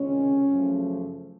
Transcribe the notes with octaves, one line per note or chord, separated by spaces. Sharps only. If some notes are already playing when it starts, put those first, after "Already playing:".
Already playing: C#2 C3 D#3 G#3 C#4
F#2 C#3 F3 A3